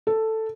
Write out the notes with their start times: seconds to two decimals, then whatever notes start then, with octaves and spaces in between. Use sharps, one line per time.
0.07 A4